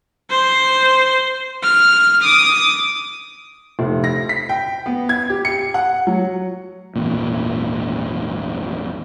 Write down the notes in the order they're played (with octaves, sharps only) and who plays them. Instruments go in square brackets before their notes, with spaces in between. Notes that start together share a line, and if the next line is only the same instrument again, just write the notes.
[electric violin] C5
F6
D6 D#6
[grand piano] F1
A#6
B6
G5
B3
G#6
G4
C#7
F#5
F#3
[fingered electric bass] G#1 E2 A#2